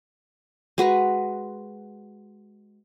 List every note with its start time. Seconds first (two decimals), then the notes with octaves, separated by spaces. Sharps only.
0.78 G#3 F#4 B4 A#5